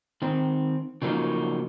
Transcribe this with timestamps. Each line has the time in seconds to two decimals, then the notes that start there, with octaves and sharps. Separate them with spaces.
0.22 D#3 C4
1.02 C#3 F3 F#3 A#3 D#4